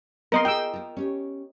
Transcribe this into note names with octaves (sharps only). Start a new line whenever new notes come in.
B3 C4 A#4 C5 D#5 C6
F4 G#4 D#5 G5 E6
F4 A#4
C#4 G4 C#5